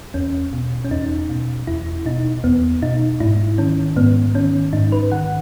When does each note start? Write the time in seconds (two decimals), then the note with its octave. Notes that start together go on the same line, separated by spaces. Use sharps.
0.14 E2 C#4
0.53 B2
0.85 C#4
0.91 E2 D#4
1.29 B2
1.67 E2 E4
2.06 B2 D#4
2.44 E2 B3
2.82 B2 D#4
3.20 G#2 E4
3.58 D#3 C#4
3.96 G#2 B3
4.35 D#3 C#4
4.73 G#2 D#4
4.92 B4
5.12 D#3 F#5